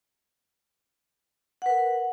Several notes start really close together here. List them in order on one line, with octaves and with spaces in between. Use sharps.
F#5 B4 A#4